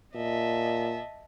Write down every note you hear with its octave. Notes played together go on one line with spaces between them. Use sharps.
A#2 D#5 E5 A5